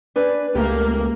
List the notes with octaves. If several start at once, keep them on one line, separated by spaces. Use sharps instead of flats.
D4 B4 G#5
C#2 A3 A#3 G4